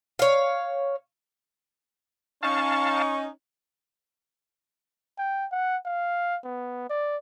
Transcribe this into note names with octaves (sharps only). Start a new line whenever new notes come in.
C#5 F5
C#4 D#4 F5 A5 C#6
G5
F#5
F5
B3
D5